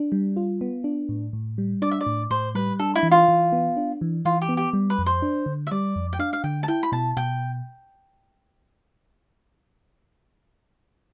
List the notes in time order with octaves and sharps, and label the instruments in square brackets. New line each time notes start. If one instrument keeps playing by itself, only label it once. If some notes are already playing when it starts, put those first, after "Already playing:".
Already playing: [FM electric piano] D4
G3
F4
B3
D4
A2
A2
G3
[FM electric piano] D4 [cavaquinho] D5
[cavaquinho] E5
D5
[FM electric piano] A2
[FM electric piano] A2 [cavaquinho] C5
[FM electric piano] G3 [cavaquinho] B4
[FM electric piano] D4 [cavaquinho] A4
[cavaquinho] E4
[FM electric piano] E3
[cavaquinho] F4
[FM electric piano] E3
B3
D4
E3
[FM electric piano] E3 [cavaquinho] F4
[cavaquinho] G4
[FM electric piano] B3
[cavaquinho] G4
[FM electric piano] G3
[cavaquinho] B4
[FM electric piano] F2
[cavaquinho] C5
[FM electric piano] D4
D3
[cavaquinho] E5
[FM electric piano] G3 [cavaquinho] D5
[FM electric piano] F2
[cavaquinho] G5
[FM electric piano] D4 [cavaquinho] F5
[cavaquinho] F5
[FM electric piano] D3 [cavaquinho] G5
[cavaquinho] A5
[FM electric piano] E4 [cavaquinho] G5
[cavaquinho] B5
[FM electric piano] B2 [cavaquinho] A5
[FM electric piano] B2 [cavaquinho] G5